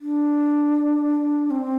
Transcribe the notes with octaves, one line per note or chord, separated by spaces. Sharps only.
D4
C4